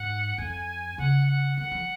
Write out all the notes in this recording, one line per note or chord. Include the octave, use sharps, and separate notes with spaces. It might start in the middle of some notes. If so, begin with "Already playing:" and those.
Already playing: G#2 F#5
F2 G#5
C#3 F#5
F#5
D#3 F#5
F3